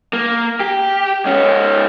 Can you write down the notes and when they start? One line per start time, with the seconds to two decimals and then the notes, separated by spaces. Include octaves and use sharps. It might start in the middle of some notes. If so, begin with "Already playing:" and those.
0.13 A#3
0.60 G4
1.25 G#2 C#4